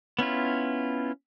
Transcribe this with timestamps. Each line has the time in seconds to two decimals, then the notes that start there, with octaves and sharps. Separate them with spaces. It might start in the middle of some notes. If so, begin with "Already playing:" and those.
0.19 B3 C#4 E4 F4